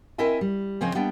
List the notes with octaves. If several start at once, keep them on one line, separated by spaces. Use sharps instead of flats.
C4 E4 A#4 D#5 E5 G#5
G3
C#3 F3 C4 C#5 D#5 G#5
G3 A#3 B3 D4 D#5 G5